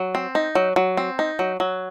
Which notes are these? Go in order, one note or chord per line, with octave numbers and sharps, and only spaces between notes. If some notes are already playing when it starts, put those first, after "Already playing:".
Already playing: F#3
C4
D#4
F#3
F#3
C4
D#4
F#3
F#3